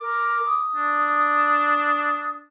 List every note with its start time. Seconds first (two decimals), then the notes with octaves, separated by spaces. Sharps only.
0.01 A#4 D6
0.47 D#6
0.76 D4